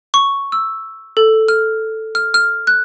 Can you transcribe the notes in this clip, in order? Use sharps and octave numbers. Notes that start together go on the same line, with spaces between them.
C#6
E6
A4
F6
F6
F6
F#6